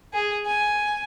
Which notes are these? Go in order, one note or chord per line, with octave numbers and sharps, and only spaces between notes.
G#4
G#5